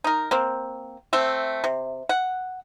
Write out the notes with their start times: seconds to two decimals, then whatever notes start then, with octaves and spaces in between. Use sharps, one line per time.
0.04 D#4 A#4
0.31 A#3 C4
1.13 A3 C4 E5
1.64 C3
2.09 F#5